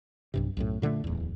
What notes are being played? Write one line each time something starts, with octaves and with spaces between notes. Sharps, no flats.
B1 G2 C3
B1 F#2 A2
A#2 D3 F3 A3
D1 E2